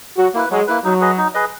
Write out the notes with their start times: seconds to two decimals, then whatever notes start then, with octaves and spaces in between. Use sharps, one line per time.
0.17 F#3 F#4
0.34 A#3 E4 B4
0.50 F#3 G#3
0.67 A#3 E4 B4
0.84 F#3 D#4
1.01 G#4 B4 D#5
1.18 D#4
1.34 G#4 B4 D#5